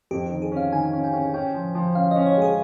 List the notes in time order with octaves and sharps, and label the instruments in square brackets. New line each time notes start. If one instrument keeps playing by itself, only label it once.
[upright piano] F2 [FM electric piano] G4
[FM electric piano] G4
[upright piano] D#3
[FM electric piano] G#4
[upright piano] C#4 [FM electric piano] F5
[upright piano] D#3 [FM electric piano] G#5
[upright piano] C#4
[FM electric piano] G5
[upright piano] C#4
[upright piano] C#4 [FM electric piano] G5
[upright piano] F3
F3
[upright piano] C#4 [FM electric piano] F5
[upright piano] C#4 [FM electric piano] D#5
[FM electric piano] C#5
[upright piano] G#3 [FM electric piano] G#4